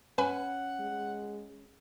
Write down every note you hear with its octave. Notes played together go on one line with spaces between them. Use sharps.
C#4 B4 F#5 G#5 B5
G#3